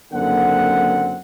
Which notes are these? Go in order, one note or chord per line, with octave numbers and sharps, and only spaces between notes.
F#1 F#2 D3 A#3 C4 F#5